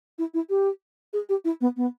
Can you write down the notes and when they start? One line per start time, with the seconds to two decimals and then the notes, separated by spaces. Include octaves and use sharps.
0.18 E4
0.34 E4
0.50 G4
1.13 G#4
1.29 G4
1.45 E4
1.61 B3
1.77 B3